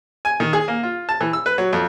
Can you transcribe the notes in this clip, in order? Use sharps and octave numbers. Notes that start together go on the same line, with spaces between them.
G#5
D#3
G#4
A#3
F4
A5
E3
E6
B4
F#3
F2